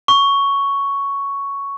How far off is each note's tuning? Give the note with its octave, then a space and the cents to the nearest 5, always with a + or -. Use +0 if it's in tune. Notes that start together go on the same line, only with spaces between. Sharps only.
C#6 +5